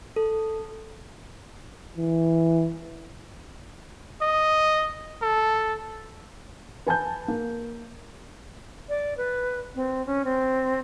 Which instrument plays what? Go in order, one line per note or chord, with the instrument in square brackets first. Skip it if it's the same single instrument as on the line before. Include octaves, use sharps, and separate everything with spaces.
[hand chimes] A4
[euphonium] E3
[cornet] D#5
A4
[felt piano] B4 G#5 A5 G6
A#3
[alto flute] D5
B4
C4
C#4
C4